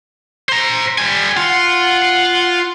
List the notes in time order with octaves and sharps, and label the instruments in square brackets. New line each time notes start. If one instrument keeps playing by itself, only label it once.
[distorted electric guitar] C5 A#5
G3 G#5
[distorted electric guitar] F4 [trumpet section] F#5